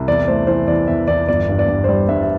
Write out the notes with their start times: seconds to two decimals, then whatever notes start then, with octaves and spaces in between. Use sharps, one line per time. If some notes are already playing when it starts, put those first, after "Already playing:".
Already playing: C2
0.08 E2 D5
0.28 A3 C5
0.47 E3 C5
0.67 E2 D5
0.87 E2 E5
1.08 E2 D5
1.28 G1 D5
1.49 G2
1.59 D5
1.68 G2
1.84 C5
1.89 G3 D5
2.09 G2 E5
2.23 E5